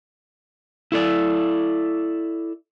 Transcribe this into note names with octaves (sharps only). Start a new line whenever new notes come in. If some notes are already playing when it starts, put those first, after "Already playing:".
E4 A4 D5